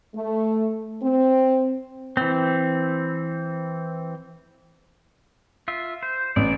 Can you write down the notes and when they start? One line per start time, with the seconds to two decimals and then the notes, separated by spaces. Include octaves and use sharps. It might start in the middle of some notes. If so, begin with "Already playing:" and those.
0.15 A3
1.02 C4
2.17 E3 C4
5.68 F4 E5
6.03 C5
6.36 A1 D5